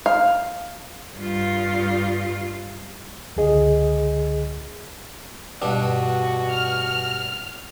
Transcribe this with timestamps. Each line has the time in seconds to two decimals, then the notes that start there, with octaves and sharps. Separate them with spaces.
0.06 F5
1.17 G2 F4
3.37 C#2 D3 G#4 D#5
5.62 G2 B2 D4 F#4
6.51 F6